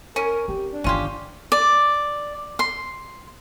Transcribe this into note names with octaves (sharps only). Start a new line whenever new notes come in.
C#4 A#4
C4 G4
D4
G1 D#3 C#4 F4 G4
D5
C6